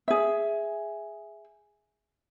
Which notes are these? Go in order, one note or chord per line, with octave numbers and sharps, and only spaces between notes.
G#4 E5